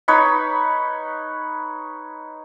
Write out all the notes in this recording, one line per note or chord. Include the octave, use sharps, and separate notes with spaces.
D#4 B4 C#5 B5